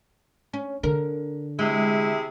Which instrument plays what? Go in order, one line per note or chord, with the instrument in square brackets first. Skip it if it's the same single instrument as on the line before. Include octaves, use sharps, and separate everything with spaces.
[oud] C#4
[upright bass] D3 [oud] A#4
[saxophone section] C3 E4 G#4 [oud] G#3